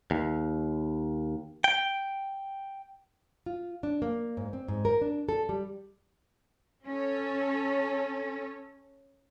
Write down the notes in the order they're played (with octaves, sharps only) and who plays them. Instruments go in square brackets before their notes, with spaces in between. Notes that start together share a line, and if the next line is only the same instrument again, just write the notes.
[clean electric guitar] D#2
G5
[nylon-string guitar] F4
D4
A#3
G#2
C4
G#2
A#4
D4
A4
G3
[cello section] C#4 A4